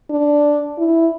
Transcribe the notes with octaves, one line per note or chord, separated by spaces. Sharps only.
D4
E4